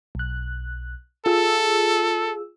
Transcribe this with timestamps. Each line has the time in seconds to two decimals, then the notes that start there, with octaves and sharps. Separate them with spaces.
0.15 B1 F#6
1.26 F4 G#4 A4 E6